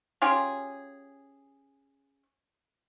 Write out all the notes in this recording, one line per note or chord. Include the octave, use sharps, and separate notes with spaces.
C#4 F4 G4 G#4